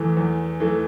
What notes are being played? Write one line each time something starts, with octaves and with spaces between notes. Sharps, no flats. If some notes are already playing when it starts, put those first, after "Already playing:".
Already playing: E2 E3 A3
E2
E3 A3